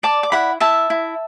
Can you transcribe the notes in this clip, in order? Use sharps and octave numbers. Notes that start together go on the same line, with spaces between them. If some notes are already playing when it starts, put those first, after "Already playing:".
D5 A5 D6
D6
E4 F#5 B5
E4 E5 A5
E4